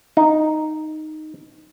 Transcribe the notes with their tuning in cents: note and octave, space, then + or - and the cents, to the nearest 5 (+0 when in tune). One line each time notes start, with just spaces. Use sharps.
D#4 -5